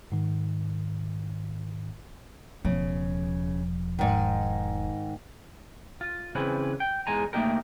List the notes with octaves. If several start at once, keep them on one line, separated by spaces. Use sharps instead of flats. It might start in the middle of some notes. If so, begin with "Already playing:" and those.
G#2 D#3
E1 C#3 F3
G#2 D#3
F4
C#3 E3 C4 C#4 B4
G5
E2 G#3 G#5 A#5
A3 A#3 C4 D#4 G4 A#4